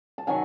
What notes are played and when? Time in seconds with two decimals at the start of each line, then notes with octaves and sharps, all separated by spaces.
0.18 A5
0.27 D#3 F#3 F#5 G#5